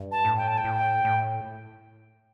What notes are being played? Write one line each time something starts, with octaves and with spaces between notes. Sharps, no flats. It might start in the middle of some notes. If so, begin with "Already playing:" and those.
Already playing: G2
A5
A2
G5
A5
G5
A2
A2